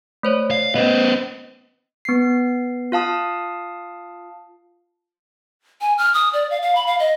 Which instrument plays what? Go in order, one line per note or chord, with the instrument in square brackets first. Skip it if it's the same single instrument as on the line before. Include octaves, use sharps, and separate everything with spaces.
[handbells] A3 C5 C#5
[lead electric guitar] F5
[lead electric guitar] B3 C5 [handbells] D#5
[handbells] B3 C7
F4 F5 A5 D#6
[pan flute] G#5
F6
D#6
D5
F5
F5
B5
F5
D#5